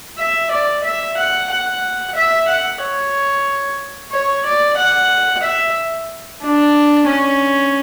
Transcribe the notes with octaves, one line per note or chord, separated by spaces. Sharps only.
E5
D5
E5
F#5
F#5
E5
F#5
C#5
C#5
D5
F#5
E5
D4
C#4